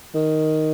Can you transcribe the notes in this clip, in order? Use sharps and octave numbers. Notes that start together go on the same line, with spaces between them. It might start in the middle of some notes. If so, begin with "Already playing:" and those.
D#3